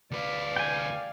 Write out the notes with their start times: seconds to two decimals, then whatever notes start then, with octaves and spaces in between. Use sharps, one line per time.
0.11 D2 B4 D5 F5
0.56 G5 G#5